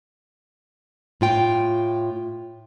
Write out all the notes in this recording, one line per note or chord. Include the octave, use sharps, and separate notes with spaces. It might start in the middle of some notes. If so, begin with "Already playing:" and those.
A2 F4 G5